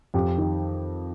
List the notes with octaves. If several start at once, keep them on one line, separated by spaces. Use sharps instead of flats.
F2 G4
D#3